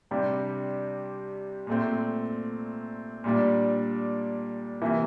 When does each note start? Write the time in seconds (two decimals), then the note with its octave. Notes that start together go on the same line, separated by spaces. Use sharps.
0.11 C3 G3 D4 G4
1.67 A#2 A3 C4
3.24 A#2 G3 D4
4.82 C3 E3 A#3 E4